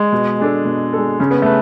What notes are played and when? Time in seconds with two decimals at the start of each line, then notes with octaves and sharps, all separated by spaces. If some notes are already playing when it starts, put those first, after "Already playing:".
Already playing: G#3
0.12 B2
0.39 G#3 D4 A4
0.65 B2
0.93 G#3 D4 A4
1.20 C#3 C#4
1.31 B3
1.42 A3 B4